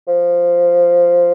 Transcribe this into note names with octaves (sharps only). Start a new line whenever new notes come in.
F3